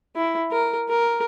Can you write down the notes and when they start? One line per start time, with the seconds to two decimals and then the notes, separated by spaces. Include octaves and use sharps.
0.16 E4
0.51 A#4
0.89 A#4